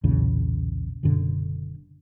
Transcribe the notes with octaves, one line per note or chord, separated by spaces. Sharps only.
B1 E2 A#2 C#3
F#1 F#2 B2 D3